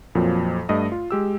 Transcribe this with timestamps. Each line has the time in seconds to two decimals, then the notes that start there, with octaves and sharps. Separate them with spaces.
0.15 F2 A#2 F3 F#3
0.69 G2 A3 D#5 D#6
0.92 F4
1.11 G#3 G4 E6